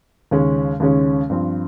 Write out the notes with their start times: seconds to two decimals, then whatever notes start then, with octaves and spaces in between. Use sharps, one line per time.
0.31 D#2 C#3 G#3 C#4
0.80 D#2 C#3 G#3 C#4
1.30 G2 F3 C4